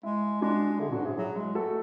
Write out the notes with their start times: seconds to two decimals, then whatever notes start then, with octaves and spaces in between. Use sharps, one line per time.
0.03 G#3 E4
0.41 G#3 D4 F#4
0.79 D3 E4 G#4
0.89 B2
0.92 A2 D4 F#4
0.99 G#2
1.05 A2 E4 G#4
1.17 F#3 E4 G#4
1.36 G#3
1.55 A3 F#4 A4